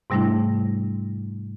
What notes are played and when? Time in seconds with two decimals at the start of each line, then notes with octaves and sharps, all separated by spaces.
0.10 G#2 C3 G3 A3 D4 E4